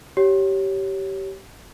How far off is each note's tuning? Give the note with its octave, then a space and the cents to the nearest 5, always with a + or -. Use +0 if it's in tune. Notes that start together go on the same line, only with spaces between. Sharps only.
G4 -20 C#5 +0